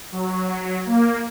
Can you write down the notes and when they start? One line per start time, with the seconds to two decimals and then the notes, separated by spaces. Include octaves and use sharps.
0.12 F#3
0.86 A#3